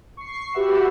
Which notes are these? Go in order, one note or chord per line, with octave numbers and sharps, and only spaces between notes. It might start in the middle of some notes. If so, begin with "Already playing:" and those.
C#6 C7
F#4 G4 B4 E5 F#5 E6